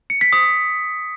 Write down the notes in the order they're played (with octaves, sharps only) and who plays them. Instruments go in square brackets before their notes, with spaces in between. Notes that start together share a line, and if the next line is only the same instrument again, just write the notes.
[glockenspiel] C#7
B6
D#6